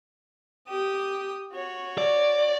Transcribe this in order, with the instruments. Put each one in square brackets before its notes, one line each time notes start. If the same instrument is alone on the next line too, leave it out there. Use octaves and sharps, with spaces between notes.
[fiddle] G4 D#6
F#4 C#5
[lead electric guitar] D5